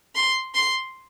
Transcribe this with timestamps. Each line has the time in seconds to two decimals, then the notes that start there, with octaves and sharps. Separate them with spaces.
0.16 C6
0.55 C6